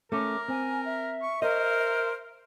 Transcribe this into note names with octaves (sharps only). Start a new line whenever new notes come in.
A3 C#4 A#4 D6
C4 G#5
E5
C#6
A#4 C5 D#5